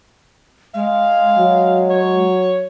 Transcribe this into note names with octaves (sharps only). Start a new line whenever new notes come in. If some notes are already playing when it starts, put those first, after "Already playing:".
G#3 F5
F#3
C#5